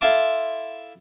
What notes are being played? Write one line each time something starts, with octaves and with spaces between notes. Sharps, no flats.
E4 A4 F5 A5 C6 D6